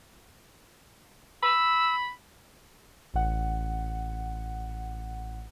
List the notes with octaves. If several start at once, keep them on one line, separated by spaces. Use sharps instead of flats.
B5 E6
A1 F#5